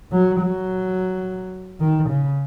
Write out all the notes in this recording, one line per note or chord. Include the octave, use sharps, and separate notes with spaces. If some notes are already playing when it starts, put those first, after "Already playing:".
F#3
F#3
D#3
C#3